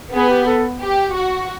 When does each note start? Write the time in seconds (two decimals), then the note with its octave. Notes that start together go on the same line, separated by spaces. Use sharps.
0.13 B3 G#4
0.29 G4
0.46 A4
0.80 G4
1.13 F#4